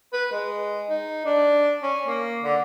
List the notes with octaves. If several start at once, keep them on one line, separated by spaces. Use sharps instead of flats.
B4
G#3
D#4
D4
C#4
A#3
D3